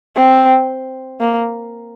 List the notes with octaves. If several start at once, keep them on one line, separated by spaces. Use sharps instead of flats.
C4
A#3